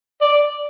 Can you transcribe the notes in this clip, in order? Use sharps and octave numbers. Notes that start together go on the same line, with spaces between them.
D5